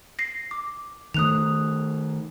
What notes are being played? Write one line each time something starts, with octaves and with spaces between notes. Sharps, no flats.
A#6 C7
D6
D#3 A3 D#6 F#6 F7